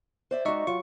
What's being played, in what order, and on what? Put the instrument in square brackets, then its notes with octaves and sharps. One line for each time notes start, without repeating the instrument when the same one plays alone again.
[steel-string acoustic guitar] C5 D5 E5
[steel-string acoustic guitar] G#3 F#4 [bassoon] D#4 [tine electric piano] D5 E5 C#6
[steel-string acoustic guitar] F#3 [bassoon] F4 [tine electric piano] C#6